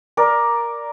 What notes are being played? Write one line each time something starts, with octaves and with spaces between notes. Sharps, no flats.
A#4 D5